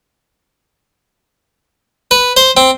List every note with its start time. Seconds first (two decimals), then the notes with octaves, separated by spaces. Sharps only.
2.11 B4
2.37 C5
2.57 C4